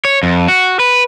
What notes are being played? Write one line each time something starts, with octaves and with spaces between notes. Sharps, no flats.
C#5
F2
F#4
B4